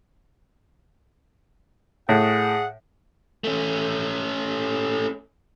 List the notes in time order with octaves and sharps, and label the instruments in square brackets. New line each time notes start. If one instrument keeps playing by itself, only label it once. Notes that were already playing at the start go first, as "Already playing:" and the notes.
[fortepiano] A2 [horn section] G#4 F#5
[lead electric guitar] A3 C#4